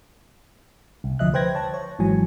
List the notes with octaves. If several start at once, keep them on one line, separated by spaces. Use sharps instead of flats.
C2
D2 F3 D#5 E5 F#6
B4 C5 G5 F#6 G#6 A#6
C#5 A5
C#5
G#1 G#2 E3 F#3 G#5